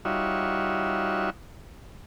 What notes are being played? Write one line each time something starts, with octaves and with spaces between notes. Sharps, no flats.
G3 D#4 F4 F#4 C#5 E5